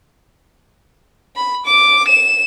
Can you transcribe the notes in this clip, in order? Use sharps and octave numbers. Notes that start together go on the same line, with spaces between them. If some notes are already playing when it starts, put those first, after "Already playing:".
B5
D6
E7